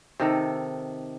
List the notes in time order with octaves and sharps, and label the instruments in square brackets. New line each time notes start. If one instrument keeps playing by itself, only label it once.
[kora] C3 D#3 A4